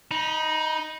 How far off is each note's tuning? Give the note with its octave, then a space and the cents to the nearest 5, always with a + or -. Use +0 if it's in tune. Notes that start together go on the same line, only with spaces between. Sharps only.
D#4 +0 B5 -35